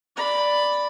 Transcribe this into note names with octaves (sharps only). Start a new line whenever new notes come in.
D5 B5